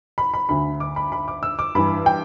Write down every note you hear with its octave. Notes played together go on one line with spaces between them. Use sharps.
B5
B5
D2 D3 B5
D6
B5
B5
D6
E6
D6
G2 E3 B5
G5